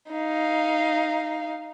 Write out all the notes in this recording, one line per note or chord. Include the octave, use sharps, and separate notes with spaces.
D#4 F5